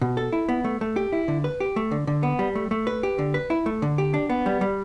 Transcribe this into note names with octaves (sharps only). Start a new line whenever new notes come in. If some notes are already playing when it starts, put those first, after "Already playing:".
B2
A4
E4
B3
A3
A3
G4
E4
D3
B4
G4
A3
D3
D3
B3
G3
A3
A3
B4
G4
D3
B4
E4
A3
D3
G4
D4
B3
G3
G3